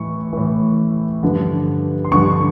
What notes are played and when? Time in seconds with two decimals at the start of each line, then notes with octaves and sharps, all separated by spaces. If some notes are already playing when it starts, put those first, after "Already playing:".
Already playing: A2 E3 C#6
0.33 A2 E3
1.23 G2 D3 F3
2.04 C6
2.12 G2 D3 F3 C#6